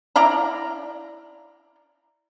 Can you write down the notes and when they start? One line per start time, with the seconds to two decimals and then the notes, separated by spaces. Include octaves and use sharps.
0.16 E4 D5 F5 A#5